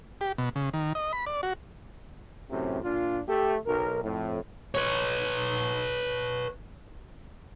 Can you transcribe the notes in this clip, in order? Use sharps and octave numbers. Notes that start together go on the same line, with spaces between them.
G4
B2
C#3
D#3
D#5
B5
D5
F#4
F#2 A2 C3
A#2 D4 F4
A3 G4
B1 A#4
F2 A2
B4 C#5